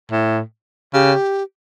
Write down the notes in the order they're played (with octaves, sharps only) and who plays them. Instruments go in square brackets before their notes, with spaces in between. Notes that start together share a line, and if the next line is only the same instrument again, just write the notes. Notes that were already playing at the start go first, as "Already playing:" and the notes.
[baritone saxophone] A2
[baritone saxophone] C#3 [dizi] G4